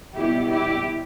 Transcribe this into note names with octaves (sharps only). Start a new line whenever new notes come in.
B2 G3 B3 E4 G4
E4 G4